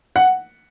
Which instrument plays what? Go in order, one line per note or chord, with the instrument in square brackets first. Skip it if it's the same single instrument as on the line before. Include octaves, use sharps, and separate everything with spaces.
[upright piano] F#5